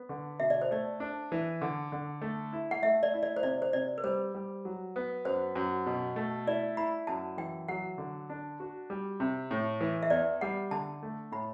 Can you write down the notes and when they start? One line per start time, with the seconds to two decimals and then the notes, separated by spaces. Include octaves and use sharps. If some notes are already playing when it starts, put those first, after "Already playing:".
Already playing: B3
0.09 D3
0.40 B2 E5
0.50 D5
0.62 C5
0.71 A3 D5
1.00 D4
1.32 E3
1.61 D3
1.92 D3
2.22 A3
2.53 E4
2.71 F#5
2.82 A3 E5
3.03 D5
3.14 E4
3.23 D5
3.36 C5
3.43 C3 D5
3.62 C5
3.73 C3 D5
3.98 B4
4.04 G3 C5
4.35 G3
4.65 F#3
4.96 B3
5.25 F#2 C5
5.55 F#2
5.86 B2
6.16 A3
6.47 E4 D5
6.77 E4 B5
7.07 F#2 A5
7.37 E3 G5
7.68 F#3 F#5
7.98 D3
8.30 D4
8.60 F#4
8.90 G3
9.20 C3
9.51 A2
9.81 E3
10.03 E5
10.10 E2 D5
10.41 G3 F#5
10.71 D3 A5
11.03 A3
11.32 A2 B5